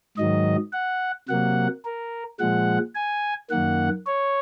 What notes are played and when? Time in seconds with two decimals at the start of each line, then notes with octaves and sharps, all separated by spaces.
0.17 G#2 D#3 F#3 D#5
0.73 F#5
1.29 C3 F#3 A#3 F#5
1.85 A#4
2.40 A#2 F3 G#3 F#5
2.95 G#5
3.50 F#2 D#3 A#3 F#5
4.07 C#5